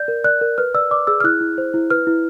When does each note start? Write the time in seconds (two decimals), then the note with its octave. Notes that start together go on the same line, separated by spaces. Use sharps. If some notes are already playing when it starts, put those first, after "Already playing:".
Already playing: D5 G6
0.08 A#4
0.24 D5 F#6
0.41 A#4
0.58 B4 F6
0.74 D5 E6
0.91 D5 D6
1.07 G#4 E6
1.20 F6
1.24 E4 F#6
1.41 E4
1.58 C5
1.74 E4
1.90 B4 F6
2.07 E4